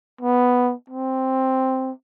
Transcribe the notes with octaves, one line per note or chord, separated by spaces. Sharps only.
B3
C4